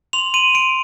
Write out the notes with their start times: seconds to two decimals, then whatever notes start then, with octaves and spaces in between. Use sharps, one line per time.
0.13 C6 F7
0.34 C6 D#7
0.54 C6 D7